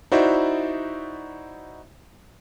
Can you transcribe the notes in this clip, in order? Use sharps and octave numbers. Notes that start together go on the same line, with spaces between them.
D#4 E4 F#4 C5 D5 E5